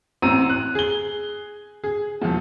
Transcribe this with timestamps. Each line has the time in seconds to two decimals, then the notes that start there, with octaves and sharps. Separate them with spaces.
0.22 A1 C4 A#5 E6 D#7
0.50 F#6
0.75 G#4 G7
1.84 G#4
2.22 E1 F3